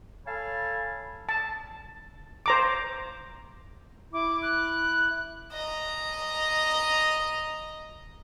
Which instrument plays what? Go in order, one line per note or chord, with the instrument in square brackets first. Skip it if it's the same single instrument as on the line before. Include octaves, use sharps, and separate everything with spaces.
[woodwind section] A4 C#5 F5 G#5 A5 B5
[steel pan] A5
C5 A#5 D6
[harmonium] E4 [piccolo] D6
[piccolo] F#6
[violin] D#5 A#5